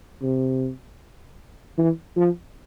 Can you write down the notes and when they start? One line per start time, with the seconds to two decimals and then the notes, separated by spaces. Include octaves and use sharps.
0.22 C3
1.78 E3
2.17 F3